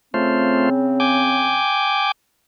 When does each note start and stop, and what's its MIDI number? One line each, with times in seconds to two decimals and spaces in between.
0.14 1.60 49
0.14 0.69 57
0.14 1.60 60
0.14 0.69 65
0.14 0.69 72
1.00 2.11 79
1.00 2.11 80
1.00 2.11 86